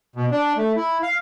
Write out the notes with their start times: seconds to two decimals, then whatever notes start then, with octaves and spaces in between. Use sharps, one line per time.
0.16 B2
0.31 D4
0.57 A3
0.76 E4
1.03 F5